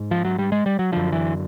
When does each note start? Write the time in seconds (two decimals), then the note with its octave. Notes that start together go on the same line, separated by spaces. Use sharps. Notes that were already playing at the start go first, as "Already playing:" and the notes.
Already playing: G#2
0.11 F3
0.25 F#3
0.39 G3
0.52 G#3
0.66 G3
0.79 F#3
0.92 F#2 D3 F3
1.13 E3